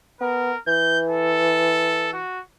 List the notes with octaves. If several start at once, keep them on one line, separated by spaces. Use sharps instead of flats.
B3 A#4
E3 G6
A4
F#4